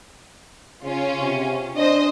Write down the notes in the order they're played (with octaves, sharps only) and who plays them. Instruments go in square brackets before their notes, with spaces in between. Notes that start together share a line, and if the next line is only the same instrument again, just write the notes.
[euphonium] C#3 [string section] C#4 F4
[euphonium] C3
[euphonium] D4 [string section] C5 D#5